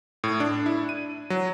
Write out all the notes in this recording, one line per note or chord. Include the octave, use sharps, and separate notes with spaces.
A2
D4
E4
D#7
F#3